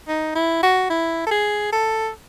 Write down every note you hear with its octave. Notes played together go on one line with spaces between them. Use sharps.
D#4
E4
F#4
E4
A4
G#4
A4